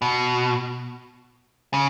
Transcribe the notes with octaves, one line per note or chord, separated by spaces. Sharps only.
B2
C#3